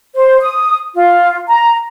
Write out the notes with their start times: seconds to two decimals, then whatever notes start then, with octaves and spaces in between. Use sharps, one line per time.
0.15 C5
0.41 D#6
0.95 F4
1.48 A#5